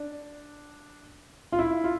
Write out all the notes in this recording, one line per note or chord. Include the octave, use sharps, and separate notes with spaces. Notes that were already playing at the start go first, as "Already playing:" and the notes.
Already playing: D4
F4
E4
F4